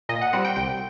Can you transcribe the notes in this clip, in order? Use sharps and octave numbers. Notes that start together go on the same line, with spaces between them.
A#2 D#5
F#5
G3 C4 F#5
G5
C2 G5